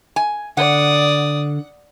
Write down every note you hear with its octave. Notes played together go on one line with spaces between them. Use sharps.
G#5
D3 D5 F#5 D#6